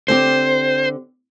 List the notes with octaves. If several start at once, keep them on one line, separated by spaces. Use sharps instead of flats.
D3 C4 G4 C5